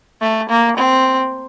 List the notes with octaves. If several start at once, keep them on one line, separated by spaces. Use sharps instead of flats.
A3
A#3
C4